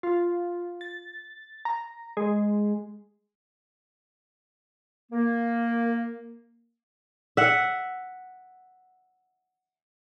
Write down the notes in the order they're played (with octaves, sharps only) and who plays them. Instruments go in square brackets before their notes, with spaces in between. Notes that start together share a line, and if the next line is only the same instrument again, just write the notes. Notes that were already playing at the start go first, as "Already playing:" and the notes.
[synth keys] F4
A6
A#5
G#3
[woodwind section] A#3
[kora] E5 F#5